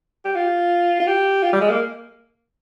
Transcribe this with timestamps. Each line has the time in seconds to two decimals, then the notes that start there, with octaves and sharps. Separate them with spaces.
0.25 G4
0.35 F4
1.00 F4
1.07 G4
1.43 F4
1.53 G3
1.61 G#3
1.70 A#3